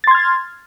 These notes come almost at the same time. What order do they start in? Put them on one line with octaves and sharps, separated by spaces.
A6 C6 G#6 F6